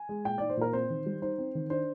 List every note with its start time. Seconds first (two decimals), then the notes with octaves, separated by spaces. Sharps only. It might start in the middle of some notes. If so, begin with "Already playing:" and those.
Already playing: G#5
0.09 G#3
0.25 A#2 G5
0.38 D#4 D5
0.50 C5
0.57 A#2 A#4
0.73 C4 C5
0.90 D#3
1.06 G3
1.22 D#4 C5
1.38 C4
1.55 D#3
1.70 D4 C5